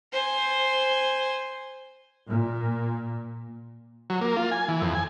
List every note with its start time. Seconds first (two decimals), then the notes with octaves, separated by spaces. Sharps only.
0.13 C5 G#5
2.27 A#2
4.10 F#3
4.21 A#3
4.37 F4
4.51 G#5
4.68 E3
4.82 F2
4.95 G#5